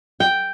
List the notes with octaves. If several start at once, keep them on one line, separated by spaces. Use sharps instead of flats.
G5